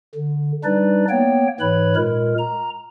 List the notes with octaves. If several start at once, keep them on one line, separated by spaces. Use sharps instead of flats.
D3
G3 D4 D#4 B4 D5
A#3 B3 C#5 G5
G#2 E3 B4 C#5 B5
A#2 G#3 A#4
A#5